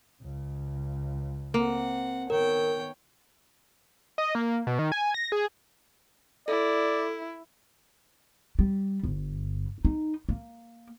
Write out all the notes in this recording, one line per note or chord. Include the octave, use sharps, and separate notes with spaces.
C#2 C#3
A#3 C4 F#5
D#3 B3 A#4 C#5 G5
D#5
A#3
B2
D#3
G#5
A#6
G#4
E4 A4 D5
G3
G1
D#4
A#3